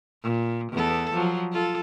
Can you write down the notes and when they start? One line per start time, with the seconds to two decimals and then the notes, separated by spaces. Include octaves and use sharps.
0.23 A#2
0.72 E2 B3 A4
1.13 F3 F#3
1.51 F4 A4